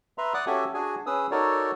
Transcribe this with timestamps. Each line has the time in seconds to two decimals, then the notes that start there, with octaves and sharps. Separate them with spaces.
0.18 B4 E5 A#5 C6
0.34 D5 F#5 D6 D#6 F#6
0.47 C#4 F#4 G4 A4 E5 G#5
0.74 D4 F#4 G#4 G#5
1.06 C#4 G#4 B4 D#6 E6
1.31 D#4 F#4 A4 A#4 C#5 D5